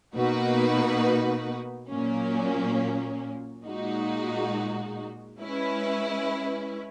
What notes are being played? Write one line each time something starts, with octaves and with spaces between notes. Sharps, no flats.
B2 A#3 D#4 F#4 B4
A#2 F#3 A#3 C#4
A#2 G#3 D#4 F#4
G#3 C#4 E4 B4